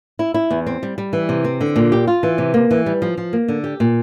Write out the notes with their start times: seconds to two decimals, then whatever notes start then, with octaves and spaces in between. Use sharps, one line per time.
0.19 E4
0.34 E4
0.51 E2
0.67 C4
0.83 G3
0.98 G3
1.13 E3
1.29 C3
1.44 C4
1.61 D3
1.76 A#2
1.92 G4
2.07 F4
2.23 E3
2.38 C3
2.54 A#3
2.71 E3
2.86 G3
3.02 F3
3.17 F3
3.33 A#3
3.48 D3
3.64 G4
3.80 A#2